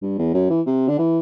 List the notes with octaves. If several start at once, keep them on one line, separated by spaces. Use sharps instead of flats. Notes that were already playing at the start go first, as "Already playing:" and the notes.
G2
E2
F#2
E3
C3
D3
E3